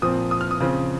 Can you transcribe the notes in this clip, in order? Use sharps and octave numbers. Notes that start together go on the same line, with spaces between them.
A#2 F3 C4 D#6
D#6
F6
D#6
C#3 F3 C4